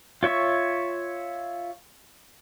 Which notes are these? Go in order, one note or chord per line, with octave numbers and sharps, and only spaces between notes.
F4 C#5 E5 C#6